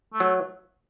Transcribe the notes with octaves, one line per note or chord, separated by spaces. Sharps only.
A3
F#3